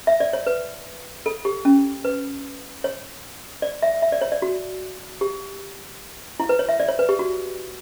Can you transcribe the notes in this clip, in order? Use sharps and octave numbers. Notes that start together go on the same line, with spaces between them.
E5
D5
C#5
B4
A4
G4
C#4
B4
C#5
D5
E5
E5
D5
C#5
D5
F#4
G4
E4
B4
C#5
E5
D5
C#5
B4
G4
F#4